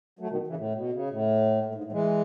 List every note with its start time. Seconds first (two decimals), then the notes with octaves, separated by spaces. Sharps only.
0.19 F#3 A3
0.29 B2 D#3
0.47 C#3 E3
0.57 A2
0.75 B2
0.93 C#3
1.10 A2
1.65 A2
1.75 G#2
1.84 A2
1.92 E3 G#3